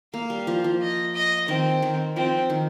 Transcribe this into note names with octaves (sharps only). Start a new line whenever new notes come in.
A#3 F5
G3
F3
F3
D#5
D#5
D#3 C4
D#3
F3 C4
D#3